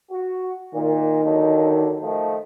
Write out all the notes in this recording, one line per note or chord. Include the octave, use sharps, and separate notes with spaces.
F#4
A#2 D#3
D#2 D3 F#3
D#3 F3 A3